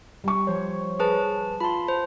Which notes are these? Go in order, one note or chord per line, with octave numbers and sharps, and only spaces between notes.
G3 C#6
F3 C5 C#5
G#4 B4 A5
F4 A5 B5 C6
C5